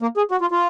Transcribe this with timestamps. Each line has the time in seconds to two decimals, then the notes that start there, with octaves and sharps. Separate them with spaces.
0.02 A#3
0.17 G#4
0.31 F#4
0.41 F4
0.51 F4